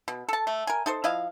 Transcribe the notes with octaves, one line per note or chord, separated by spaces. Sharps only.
B2
A4 A5
A3
A#4 G#5
D#4 A4 C5
F3 E4 D#5 F5